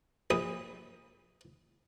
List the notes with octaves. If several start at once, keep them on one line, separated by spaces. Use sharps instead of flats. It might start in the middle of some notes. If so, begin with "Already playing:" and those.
A#1 D#6